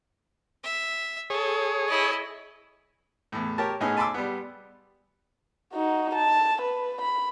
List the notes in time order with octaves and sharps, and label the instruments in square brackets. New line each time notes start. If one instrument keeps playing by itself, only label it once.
[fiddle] E5
[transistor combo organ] G#4 C#5 [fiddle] A4
[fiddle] E4 D#5
[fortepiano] E2 A2
G4 A#4 C#5 A5
A2 B3 C#4 D#4 G#4
G#5 A5 B5 C6 D6 E6
G3 B3
[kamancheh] D#4 F#4
A5
B4
B5